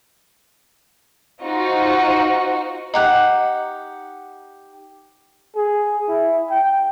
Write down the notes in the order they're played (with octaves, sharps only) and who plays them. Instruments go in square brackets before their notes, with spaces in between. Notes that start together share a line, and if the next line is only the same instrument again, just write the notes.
[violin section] D#4 F4 F#4 C5 C#6
[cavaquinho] D#4 G4 F#5
[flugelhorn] G#4
E4
G5